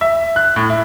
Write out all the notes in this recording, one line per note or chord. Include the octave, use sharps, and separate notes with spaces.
E5
F#6
A2
E4